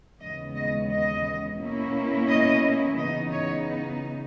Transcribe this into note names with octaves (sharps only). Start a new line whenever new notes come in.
D#2 C#3 E3 G#3 B3 D#5
D#5
D#5
B2 A#3 C#4 E4
D#5
C#3 E3 B3 D#4 D#5
C#5